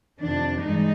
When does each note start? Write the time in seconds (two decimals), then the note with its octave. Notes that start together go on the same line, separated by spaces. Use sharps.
0.21 F2 C3 D#3 D4
0.62 G2 E3 G#3 D#4